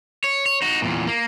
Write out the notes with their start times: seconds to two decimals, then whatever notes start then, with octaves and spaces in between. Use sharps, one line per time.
0.24 C#5
0.46 C#5
0.62 D#4 F#4
0.82 E2 A#2
1.07 A#3